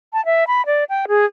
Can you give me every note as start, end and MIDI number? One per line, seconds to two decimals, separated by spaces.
0.13 0.24 81
0.25 0.44 76
0.47 0.65 83
0.66 0.84 74
0.89 1.06 79
1.08 1.25 68